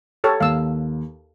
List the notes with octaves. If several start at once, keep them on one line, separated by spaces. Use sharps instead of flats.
G4 A4 C#5
D#2 F5 E6